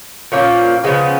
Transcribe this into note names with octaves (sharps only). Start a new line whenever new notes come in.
A#2 F3 A#3 C#4
C#3 F3 G#3 B3